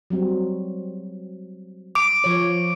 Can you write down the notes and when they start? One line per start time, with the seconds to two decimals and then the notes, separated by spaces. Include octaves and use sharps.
0.10 F#3 G3 C4
1.95 D6 D7
2.24 F3 C#5